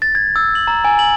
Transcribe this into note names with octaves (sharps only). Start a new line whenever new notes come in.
A6
G#6
E6
F#7
A#5
G#5
F#7